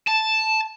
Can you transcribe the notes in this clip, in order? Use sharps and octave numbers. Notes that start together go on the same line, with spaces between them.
A5